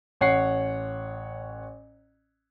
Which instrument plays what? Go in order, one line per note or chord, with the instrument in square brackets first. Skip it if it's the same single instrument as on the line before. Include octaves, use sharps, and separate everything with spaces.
[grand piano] A1 C#5 F#5 C7